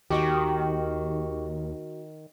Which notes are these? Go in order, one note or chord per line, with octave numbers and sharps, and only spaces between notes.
D#2 D#3 F#4 G4 D#5 G5 C#6